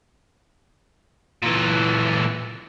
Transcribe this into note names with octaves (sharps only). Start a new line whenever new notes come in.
A#2 E3